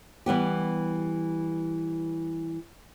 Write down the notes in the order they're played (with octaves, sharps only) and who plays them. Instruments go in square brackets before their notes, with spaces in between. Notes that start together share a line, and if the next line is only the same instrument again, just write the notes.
[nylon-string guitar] E3 G3 B3 G4